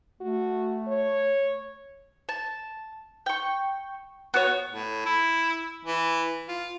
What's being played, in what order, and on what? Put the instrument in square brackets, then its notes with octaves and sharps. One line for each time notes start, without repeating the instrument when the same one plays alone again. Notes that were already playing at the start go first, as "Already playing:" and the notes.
[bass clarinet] A3 [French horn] F#4
[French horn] C#5
[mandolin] A5
G5 C#6
B3 F#4 C#5
[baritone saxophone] A2
E4
E3
F4